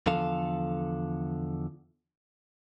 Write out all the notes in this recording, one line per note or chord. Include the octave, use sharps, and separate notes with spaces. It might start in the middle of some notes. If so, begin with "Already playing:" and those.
E2 D3 F3 A4 F5